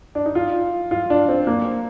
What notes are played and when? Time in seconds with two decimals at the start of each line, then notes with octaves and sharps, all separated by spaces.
0.15 D4
0.26 D#4
0.35 F4
0.91 F4
1.10 D4
1.29 C4
1.47 A#3